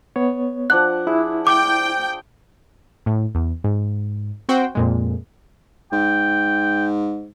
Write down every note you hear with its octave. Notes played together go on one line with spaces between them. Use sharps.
B3 C#5
F3 D4 F#5 F#6
E4 G#4
G5 D6
A2
E2
G#2
C4 F#4 C5 G5
F2 A#2 G#3
G#2 G5